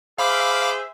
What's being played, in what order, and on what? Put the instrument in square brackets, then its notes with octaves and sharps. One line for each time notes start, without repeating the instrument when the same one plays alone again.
[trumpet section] G#4 C5 E5 [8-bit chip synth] F5 B5 D6